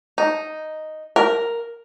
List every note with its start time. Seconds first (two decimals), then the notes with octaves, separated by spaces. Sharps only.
0.18 D#4
1.16 A#4